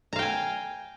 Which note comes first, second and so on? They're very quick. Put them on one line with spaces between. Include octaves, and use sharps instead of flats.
A#5 F5 G5 G#5